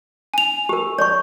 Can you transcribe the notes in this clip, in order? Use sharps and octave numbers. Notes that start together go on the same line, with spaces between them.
G#5 F7
G4 A#4
C#5 D5 C#6